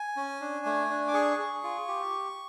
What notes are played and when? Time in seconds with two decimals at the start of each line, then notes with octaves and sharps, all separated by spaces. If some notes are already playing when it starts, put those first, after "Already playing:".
Already playing: G#5
0.16 C#4
0.41 D4
0.66 A3
0.90 D4
1.08 D6
1.14 G#4 C#6
1.39 G#4
1.64 F4
1.88 G4